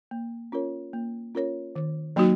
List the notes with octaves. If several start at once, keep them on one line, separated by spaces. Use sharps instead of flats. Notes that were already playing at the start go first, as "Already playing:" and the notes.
A#3
C#4 F4 A#4 C#5
A#3
C#4 F4 A#4 C#5
D#3
F#3 A#3 D#4 F#4